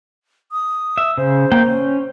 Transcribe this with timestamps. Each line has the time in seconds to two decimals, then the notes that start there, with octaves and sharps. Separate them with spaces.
0.52 D#6
0.98 E5
1.18 C#3 C5
1.52 A#3 G5
1.66 C#4